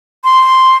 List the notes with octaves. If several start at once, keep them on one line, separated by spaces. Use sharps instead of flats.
C6